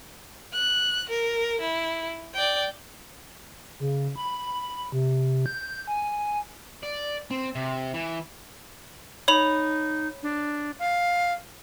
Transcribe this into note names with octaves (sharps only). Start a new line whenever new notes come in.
F#6
A#4
E4
D5 G5
C#3
B5
C3
G6
G#5
D5
C4
C3
E3
D#4 C#5 B5 F7
D4
F5